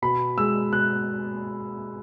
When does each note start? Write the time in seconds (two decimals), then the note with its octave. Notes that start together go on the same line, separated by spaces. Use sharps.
0.02 B2 B5
0.38 G#3 E6
0.72 B2 F#6